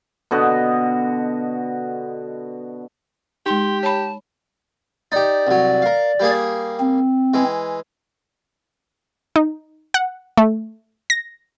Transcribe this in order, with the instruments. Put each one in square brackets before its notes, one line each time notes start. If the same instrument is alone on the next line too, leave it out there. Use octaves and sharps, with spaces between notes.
[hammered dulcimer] B2 D3 F#4 D#5
[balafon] G#3 D#4 [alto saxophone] G4 [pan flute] C6
[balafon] C#5 B5 [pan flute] A5
[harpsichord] D#4 G4 [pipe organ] D5
[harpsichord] C2 F#3
A#4 F5
G3 A#3 G#4
[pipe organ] C4
[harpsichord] E3 G#3
[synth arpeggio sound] D#4
F#5
A3
A#6